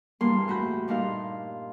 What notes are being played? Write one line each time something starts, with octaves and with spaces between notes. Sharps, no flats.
E2 G2 G3 A#3 C6
A2 F#4 B5 G6
G2 A#2 D#4 F5 C6